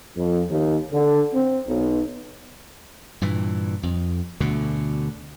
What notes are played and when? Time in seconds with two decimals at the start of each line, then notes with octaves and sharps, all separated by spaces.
0.16 F2
0.50 D#2
0.92 D3
1.34 C4
1.67 B1
3.21 G2 A#2 E3
3.83 F2
4.40 D2 B2 D3